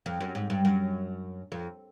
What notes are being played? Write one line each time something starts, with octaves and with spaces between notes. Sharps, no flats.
F2
F#2
G#2
G2
F#2
F2